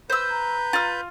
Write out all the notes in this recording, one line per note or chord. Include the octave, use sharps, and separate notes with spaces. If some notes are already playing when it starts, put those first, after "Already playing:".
B4 C5 E6 G6
A#5
F4 F6